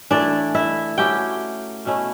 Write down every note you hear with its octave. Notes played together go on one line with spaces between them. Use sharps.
E3 A3 D4 E4 D5
E4 E5
F#3 A3 C#4 E4 G4 G5
B2 A3 C#4 E4